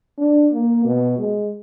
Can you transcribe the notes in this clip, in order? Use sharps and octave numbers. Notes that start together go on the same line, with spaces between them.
D4
A#3
B2
G#3